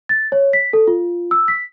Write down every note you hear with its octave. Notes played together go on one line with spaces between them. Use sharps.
A6
C#5
B6
A4
F4
E6
B6